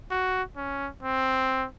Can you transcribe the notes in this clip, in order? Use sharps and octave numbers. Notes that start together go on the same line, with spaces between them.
F#4
C#4
C4